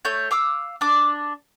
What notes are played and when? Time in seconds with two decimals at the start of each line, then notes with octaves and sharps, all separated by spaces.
0.05 A3 C#5 G6
0.31 F5 D6 E6
0.81 D4 D6